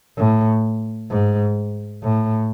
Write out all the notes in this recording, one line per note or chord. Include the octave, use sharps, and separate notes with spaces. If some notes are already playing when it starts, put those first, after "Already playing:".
A2
G#2
A2